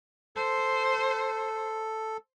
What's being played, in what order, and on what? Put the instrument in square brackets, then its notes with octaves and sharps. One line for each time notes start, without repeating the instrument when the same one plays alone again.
[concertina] A4 [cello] C5